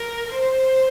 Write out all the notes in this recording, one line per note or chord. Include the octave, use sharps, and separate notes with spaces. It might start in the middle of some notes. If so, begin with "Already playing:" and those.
Already playing: A#4
C5